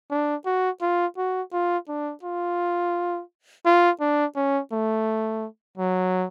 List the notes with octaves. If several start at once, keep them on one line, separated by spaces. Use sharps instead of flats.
D4
F#4
F4
F#4
F4
D4
F4
F4
D4
C#4
A3
F#3